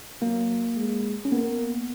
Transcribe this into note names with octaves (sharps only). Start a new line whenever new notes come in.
F#3 A#3
G#3
C#4
A#3 B3